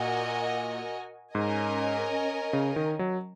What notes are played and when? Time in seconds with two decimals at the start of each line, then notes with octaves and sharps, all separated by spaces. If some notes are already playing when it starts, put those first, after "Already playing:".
Already playing: A#2 F#4 A#4 D#5 G#5
1.35 G#2 C#4 A#4 D#5 G#5
2.53 C#3
2.76 D#3
2.99 F#3